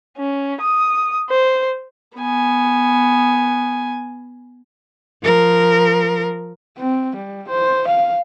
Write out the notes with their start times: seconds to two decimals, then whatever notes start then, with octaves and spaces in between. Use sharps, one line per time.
0.18 C#4
0.61 D#6
1.30 C5
2.17 B3 G#5
5.23 F3 A#4
6.78 C4
7.16 G3
7.49 C5
7.88 F5